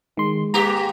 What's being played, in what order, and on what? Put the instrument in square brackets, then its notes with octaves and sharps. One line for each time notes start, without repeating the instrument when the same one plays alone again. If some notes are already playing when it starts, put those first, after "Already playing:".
[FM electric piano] D#3 C6 [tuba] G#3
[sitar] G#2 A#3 G4 [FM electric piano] A#5